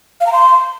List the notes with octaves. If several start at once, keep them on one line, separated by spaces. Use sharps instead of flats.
F5
A#5
C6